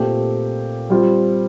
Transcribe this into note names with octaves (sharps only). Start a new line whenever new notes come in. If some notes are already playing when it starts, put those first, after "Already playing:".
Already playing: A#2 A3 C4 G4
G3 C4 F4